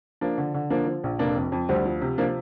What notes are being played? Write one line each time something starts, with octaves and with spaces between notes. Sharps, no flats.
F3 A#3 D4
D3
D3
F3 A#3 D4
F3
A#1
F1 A#3 D4
F2
F2
D2 G3 C4
F3
C3
F3 A#3 D4